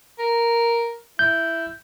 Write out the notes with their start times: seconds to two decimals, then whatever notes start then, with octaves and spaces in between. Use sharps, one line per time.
0.19 A#4
1.19 E4 G6